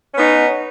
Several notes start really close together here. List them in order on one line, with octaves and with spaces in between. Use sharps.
C#4 B3 D#4